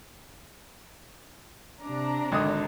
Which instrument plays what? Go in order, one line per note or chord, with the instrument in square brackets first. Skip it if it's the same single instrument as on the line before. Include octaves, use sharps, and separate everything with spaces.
[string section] C3 D4 A#5
[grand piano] G#1 D3 D#6